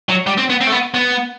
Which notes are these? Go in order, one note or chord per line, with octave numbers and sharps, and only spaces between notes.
F#3
G3
C4
B3
C4
A3
B3
B3